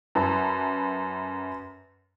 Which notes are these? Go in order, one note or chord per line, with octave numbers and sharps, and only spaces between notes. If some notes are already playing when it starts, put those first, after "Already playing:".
F#2 B4 A5